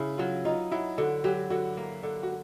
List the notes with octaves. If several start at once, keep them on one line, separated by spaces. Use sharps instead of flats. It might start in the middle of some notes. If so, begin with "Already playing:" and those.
Already playing: C#3 E4
F#3 F4
D#4 F4
F#3 E4
D3 F#4
F#3 G4
D3 F#4
A#3
D3
F#4